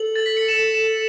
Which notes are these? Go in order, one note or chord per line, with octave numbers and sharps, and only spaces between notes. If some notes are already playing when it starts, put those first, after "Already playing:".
Already playing: A4 F#7
A6
B6
C#7
E7
E7